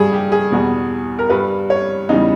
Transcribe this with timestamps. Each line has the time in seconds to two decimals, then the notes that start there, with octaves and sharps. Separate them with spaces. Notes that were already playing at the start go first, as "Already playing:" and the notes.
Already playing: G2 G3 G#4
0.13 G4
0.32 G#4
0.52 E2 B2 G3
1.19 A#4
1.30 G2 G3 B4
1.70 C#5
2.09 E2 C#3 E3 G3 D#4